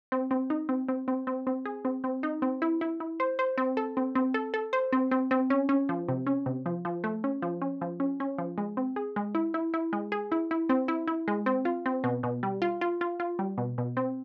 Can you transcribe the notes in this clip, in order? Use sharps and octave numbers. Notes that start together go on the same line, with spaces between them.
C4
C4
D#4
C4
C4
C4
C4
C4
G#4
C4
C4
D#4
C4
E4
E4
E4
C5
C5
C4
A4
C4
C4
A4
A4
C5
C4
C4
C4
C#4
C#4
F3
C3
C#4
C3
F3
F3
A3
C#4
F3
C#4
F3
C#4
C#4
F3
G#3
C4
G#4
G#3
E4
E4
E4
G#3
G#4
E4
E4
C4
E4
E4
G#3
C4
F4
C4
B2
B2
G3
F4
F4
F4
F4
G3
B2
B2
C4